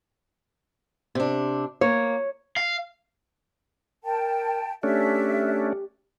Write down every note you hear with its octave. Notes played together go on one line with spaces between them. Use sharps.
C3 D4
A#3 C#5
F5
A#4 G5 A5
A3 C#4 D4 G4 E5